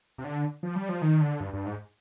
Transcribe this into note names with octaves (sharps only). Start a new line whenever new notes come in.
C3
D3
F3
G3
F3
D#3
D3
G2
G2
G#2